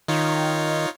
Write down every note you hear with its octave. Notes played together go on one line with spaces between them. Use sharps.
D#3 D#4 F4 C#5